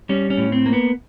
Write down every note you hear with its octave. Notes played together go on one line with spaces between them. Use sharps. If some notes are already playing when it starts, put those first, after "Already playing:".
G3 C#4
C#4
A2
C4
A#3
B3